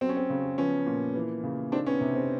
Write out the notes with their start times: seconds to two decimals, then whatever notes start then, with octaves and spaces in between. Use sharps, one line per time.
0.01 F#3 C4
0.09 C#4
0.17 C4
0.30 C#3
0.58 F3 B3 C#4
0.87 A#2
1.15 E3
1.44 C#3
1.72 D#3 C4 D4
1.86 B3 C#4
2.01 C3
2.15 C4